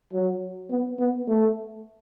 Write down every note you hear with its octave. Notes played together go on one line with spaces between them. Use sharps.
F#3
B3
B3
A3